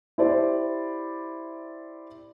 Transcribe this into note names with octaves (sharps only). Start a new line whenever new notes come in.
E4 G4 C5 D5